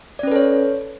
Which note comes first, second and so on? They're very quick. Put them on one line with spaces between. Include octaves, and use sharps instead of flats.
D5 C#4 B4 A4 C#5